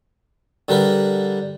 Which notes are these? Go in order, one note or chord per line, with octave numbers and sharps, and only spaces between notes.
D3 G3 A#4 B4